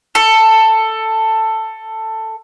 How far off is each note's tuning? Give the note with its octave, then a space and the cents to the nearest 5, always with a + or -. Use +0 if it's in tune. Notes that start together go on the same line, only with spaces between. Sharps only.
A4 +10